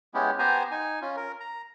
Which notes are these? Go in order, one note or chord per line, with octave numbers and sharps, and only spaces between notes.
G#3 B3 C#4 E4 G4
B3 G4 C5 G#5 A#5
D#4 G#5
C#4 F4
A#4
A#5